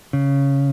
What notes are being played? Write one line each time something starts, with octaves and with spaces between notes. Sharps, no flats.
C#3